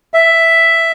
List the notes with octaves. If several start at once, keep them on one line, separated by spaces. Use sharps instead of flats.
E5